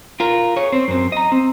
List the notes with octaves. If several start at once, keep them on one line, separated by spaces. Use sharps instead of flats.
F4 A#4
G#4 C#5
C4
F#2 C4
D#5 A#5
C4